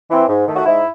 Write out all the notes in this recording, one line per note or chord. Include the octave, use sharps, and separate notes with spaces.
E3 C4
G#2
D#3 A3
F#4
G#2 E4